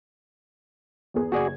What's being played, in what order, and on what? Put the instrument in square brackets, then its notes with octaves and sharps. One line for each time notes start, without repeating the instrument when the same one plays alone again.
[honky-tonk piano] E2 B3 G#4
[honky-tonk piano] F#1 G#6 [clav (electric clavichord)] F#4 G#4 D5